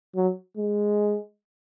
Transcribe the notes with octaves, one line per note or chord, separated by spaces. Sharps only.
F#3
G#3